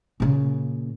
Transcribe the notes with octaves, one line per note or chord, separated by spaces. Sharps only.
A#2 C#3